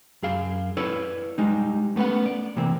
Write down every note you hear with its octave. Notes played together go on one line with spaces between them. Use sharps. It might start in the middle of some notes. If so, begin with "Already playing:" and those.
F#2 G#4 F5
E4 A4 B4 C#5 D5
G3 G#3 D#4
A3 B3 C#4 B4 F#5
D5
C3 E3 A#3 C4